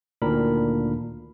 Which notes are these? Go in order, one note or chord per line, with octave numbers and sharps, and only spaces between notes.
D2 A#2 D#3 D4 A#4 B5